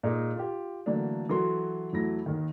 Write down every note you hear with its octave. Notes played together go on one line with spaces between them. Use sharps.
A#2 G#3 D#4
F4 G4
D3 E3 F#3 A3 A#3 D4
E3 F#3 F#4 A4 B4 C6
E2 F#3 A3 E4 A#6
D#2 D#3